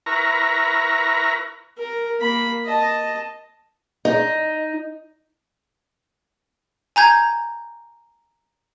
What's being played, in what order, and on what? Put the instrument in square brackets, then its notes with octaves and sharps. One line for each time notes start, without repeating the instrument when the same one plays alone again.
[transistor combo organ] E4 A#4 B4 A#5 C#6
[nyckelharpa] A#4
A#3 B5
D#5 A5
[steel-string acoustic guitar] D#4
[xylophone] G#5 A#5 G6 G#6